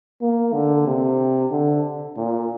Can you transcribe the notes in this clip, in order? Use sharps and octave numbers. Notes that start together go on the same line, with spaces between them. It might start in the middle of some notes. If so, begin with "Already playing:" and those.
A#3
D3
C3
D3
A#2